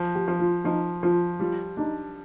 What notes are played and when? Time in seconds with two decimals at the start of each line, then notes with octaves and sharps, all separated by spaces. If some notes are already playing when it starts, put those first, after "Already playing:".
Already playing: F3
0.15 G4
0.28 F3
0.39 F4
0.64 F3 D#4
1.03 F3 F4
1.39 G3 F4
1.77 D4 D#4